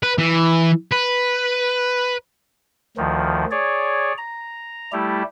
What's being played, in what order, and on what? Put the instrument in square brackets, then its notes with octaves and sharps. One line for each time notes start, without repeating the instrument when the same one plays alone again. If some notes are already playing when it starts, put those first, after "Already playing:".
[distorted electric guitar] B4
E3
B4
[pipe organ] D2 D#3 F3
G#4 C#5 D5
A#5
G3 A3 E4 G4